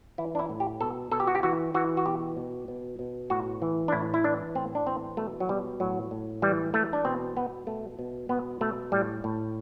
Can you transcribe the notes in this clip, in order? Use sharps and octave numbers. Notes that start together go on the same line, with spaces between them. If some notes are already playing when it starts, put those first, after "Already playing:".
E3 E4
D4
E4
A2
G4
B2 A4
B2 A4
G4
F#4
G4
E3 F#4
E3 F#4
F#4
B2 G4
B2
B2
B2
A2 F#4
E3
D4
A2 E4
E4
E3 D4
A2 C4
D4
E3 C4
B2 A3
F#3
B2 G3
A2 F#3
A2
E3 G3
E3 A3
D4
B2 C4
B2 B3
B2 A3
B2
B2 B3
B2 A3
A2 G3
A2